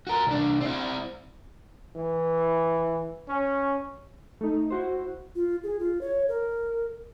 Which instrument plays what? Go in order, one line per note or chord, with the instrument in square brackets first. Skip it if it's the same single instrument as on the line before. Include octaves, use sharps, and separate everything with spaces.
[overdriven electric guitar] F#4 A#4
C2 D4
C4 E4
[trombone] E3
C#4
[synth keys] A3 D#4
E4 F#4 C5
[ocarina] F4
G#4
F4
C#5
A#4